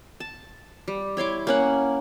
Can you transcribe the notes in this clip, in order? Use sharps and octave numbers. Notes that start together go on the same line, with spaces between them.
A5
G3
E4 C#5 C6 D6
A#3 C#4 F#5